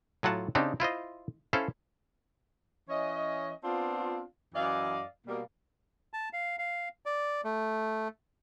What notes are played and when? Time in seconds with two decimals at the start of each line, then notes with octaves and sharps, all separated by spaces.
0.23 A2 F#3 F4 F#5 A5
0.55 C#3 C4 D4 D#4 G4
0.80 E4 F4 C5 D#5
1.53 C#4 E4 A4 C5 F5
2.88 E3 C#4 C#5 D#5
3.63 B3 C4 D4 F4
4.55 F#2 E3 D5 D#5 F5
5.26 B2 G3 A#3
6.13 A5
6.33 F5
6.59 F5
7.06 D5
7.44 A3